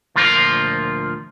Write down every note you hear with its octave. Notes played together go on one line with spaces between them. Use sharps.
D2 A#2 F3 F4 A#4 F5